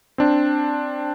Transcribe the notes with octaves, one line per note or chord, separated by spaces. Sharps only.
C4 D4